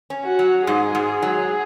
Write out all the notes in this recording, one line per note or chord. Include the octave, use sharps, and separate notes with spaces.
C#4
F#4
F#3
G#2 G#4
G#2
F#3